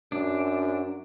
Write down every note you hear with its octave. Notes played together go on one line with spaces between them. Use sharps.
F#2 D4